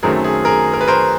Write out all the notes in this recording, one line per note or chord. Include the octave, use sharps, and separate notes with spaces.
F#2 D#3 F#3 A3 C4 G#4 A#4
G#4
G#4 A#4
A#4
B4
A#4 C5